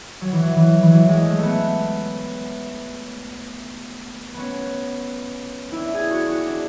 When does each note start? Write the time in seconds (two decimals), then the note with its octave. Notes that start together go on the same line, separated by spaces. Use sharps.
0.21 F#3
0.32 E3
0.43 F#3
0.56 E3
0.83 E3
0.91 F#3
1.09 G#3
1.25 A3
1.39 A3 B3
1.60 B3
4.34 B3 C#4
5.72 D4 E4
5.95 G#4
6.11 F#4
6.29 F#4
6.46 D4